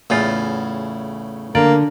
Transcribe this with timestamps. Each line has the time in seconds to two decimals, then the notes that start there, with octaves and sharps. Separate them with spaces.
0.10 E2 A2 C#3 F4
1.55 D3 A#3 D5